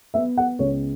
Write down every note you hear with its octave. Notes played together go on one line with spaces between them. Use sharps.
B3 E5
F#5
C#2 C#5